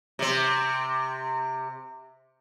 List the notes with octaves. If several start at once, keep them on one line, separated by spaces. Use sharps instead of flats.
C3 C4